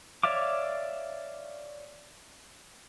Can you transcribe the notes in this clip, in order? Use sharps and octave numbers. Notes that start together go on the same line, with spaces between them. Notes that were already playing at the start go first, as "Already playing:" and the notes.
C#5 D5 E5 F5 D6